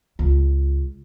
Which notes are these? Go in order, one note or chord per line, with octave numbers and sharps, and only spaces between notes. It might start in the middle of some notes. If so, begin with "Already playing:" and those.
C#2